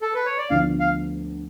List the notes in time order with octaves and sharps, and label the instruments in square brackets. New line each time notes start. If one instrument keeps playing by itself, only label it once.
[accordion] A4
B4
C#5
D5
[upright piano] D2 D3 F3 B3 D4 [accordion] F5
[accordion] F5